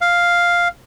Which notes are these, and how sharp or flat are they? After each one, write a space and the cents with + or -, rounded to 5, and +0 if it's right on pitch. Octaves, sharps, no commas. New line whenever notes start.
F5 +0